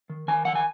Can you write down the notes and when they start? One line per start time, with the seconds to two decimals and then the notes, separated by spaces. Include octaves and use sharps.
0.10 D#3
0.28 D#3 G#5
0.45 D#3 F#5
0.55 G#5